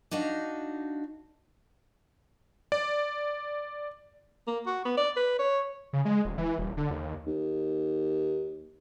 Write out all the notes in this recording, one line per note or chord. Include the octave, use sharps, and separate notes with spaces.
D4 D#4 F#4 F5
D5
A#3
F#4
B3
D5
B4
C#5
C#3
G#3
D#1
E3
D#1
D3
D#2
D#2